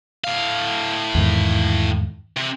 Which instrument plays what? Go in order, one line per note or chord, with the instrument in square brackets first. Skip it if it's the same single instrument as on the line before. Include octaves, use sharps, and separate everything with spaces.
[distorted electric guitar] A2 F5
[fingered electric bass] E2 G#2 D#3
[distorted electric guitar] C3